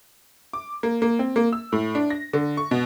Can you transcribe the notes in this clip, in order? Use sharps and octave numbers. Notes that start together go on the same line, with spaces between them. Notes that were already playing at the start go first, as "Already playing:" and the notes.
D6
A#3
A#3
C4
A#3
E6
A2
D4
A#6
D3
C#6
B2